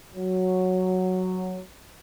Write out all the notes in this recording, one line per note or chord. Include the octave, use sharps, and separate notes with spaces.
F#3